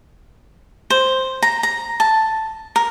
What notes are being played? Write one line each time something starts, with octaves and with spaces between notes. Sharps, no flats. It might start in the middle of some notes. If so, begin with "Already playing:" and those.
C5
A#5
A#5
A5
A#4